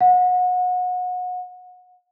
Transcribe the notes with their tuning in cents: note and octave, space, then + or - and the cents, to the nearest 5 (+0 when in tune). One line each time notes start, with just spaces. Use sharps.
F#5 -30